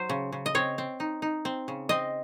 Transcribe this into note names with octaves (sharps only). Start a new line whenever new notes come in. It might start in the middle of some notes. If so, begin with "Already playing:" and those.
Already playing: F#3 C5
C#3
C#3
D#5
C4 C#5
C4
D#4
D#4
C4
C#3
C4 D#5